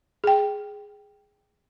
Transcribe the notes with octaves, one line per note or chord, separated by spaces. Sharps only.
G#4 G5